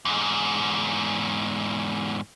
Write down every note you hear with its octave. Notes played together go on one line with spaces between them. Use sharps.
E2 G#2